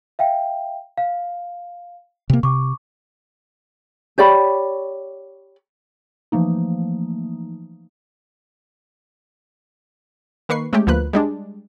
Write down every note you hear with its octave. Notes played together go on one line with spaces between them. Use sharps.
E5 F5 G5
F5
C3 A#3
C3 C#6 D6
G4 C#5 D5 B5
E3 F3 A3 A#3 D#4
D#3 A#3 B4 C#6 C7
G#3 A3 C#4 G4
D2 F3 A#3 B4 F#6
G3 G#3 D4